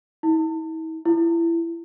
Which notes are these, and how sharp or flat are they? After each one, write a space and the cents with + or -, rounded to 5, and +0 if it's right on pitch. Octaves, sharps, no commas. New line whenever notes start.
E4 -45
E4 +25